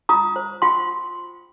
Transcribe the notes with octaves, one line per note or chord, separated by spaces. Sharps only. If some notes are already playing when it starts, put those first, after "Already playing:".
F4 A#5 D#6
C5
F4 G5 C6